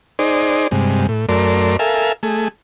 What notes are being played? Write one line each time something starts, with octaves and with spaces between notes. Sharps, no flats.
D#4 G#4 C5 D5
G2 C3 G#3
A2
F#2 A3 A#4 D5 C6
A4 A#4 E5 F5 G#5
A3 G#4